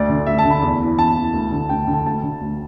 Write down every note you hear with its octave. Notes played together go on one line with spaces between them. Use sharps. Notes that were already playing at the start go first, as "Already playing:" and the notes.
Already playing: D2 D5
D3
D2 E5
A5
D3
B5
E2
E3
E2 A5
E3
D2
D3
D2 G5
D3
A5
D2 A5
D3
D2